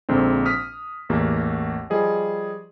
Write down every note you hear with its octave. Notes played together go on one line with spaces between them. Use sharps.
A#1 G#2 D3 C4
D#6 F6 B6
A1 E2 A#3 G4
F3 G3 G#4 D#5